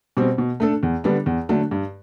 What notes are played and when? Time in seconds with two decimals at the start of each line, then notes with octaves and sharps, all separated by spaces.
0.17 B2 G3 C4
0.38 B2
0.60 A3 D4 A4
0.83 E2
1.04 D3 G3 B3 D4
1.26 E2
1.49 D3 F#3 A3 D4
1.71 G2